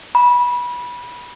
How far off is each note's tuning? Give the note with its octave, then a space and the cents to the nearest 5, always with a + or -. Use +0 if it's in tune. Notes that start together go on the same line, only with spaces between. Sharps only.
B5 -20